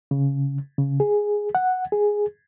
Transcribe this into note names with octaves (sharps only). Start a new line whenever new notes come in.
C#3
C#3
G#4
F#5
G#4